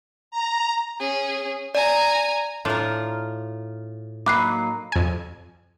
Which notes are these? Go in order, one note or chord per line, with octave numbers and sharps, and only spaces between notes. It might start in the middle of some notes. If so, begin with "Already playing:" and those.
A#5
C#4 G#4
D5 G#5 A#5
A2 D4 F4 A#4
F#3 A#3 D#4 B5 D6 F#6 C7
F2 G#5